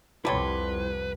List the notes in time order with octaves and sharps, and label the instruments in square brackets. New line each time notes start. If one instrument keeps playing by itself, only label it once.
[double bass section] C2 F2 [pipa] D3 G3 C#5 [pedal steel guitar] E4 C6 [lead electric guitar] B4